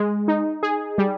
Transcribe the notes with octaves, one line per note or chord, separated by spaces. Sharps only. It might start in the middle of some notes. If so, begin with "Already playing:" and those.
Already playing: G#3
D#4
G#4
G3